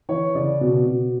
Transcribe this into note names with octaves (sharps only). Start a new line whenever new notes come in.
E3 C#5
C#3 D5
B2
B2